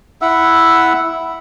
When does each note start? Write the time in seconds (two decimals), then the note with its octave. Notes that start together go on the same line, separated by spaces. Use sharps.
0.22 E4 E5 F#5 E6